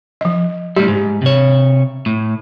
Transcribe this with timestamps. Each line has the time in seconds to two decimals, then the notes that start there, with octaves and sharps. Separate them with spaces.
0.21 F3 D#5
0.76 A2 G3 G4
0.88 G#2
1.22 C3 C#5
2.06 A2